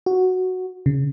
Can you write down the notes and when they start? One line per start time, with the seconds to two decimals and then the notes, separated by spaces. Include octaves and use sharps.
0.06 F#4
0.86 C#3